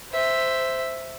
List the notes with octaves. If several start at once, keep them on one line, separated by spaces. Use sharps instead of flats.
C5 E5